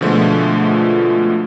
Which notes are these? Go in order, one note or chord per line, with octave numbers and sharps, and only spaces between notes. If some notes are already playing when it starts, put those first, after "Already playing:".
B2 D3 F3 G#3 A3 F4